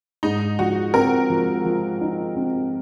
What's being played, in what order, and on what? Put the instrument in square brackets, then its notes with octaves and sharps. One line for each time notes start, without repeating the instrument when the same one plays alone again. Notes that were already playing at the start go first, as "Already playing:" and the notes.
[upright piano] G#2 [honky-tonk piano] D#4
[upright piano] F3 [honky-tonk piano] F#4
[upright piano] C4 [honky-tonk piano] A#4
[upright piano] F3
F3
D#4
C4